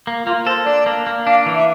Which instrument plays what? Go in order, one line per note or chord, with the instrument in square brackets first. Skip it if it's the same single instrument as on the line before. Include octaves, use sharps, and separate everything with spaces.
[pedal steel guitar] A#3
[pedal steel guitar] A#3 [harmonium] F4
[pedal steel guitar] A4 [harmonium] C5
[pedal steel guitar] D4 [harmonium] D5
[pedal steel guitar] A#3
A#3
[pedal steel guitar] D4 [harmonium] F5
[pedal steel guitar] E3
[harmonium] E5